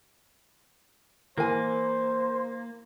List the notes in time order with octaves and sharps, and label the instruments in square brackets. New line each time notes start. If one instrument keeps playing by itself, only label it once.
[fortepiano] E3 [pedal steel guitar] A#3 [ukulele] A#4 G#5 [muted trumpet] C5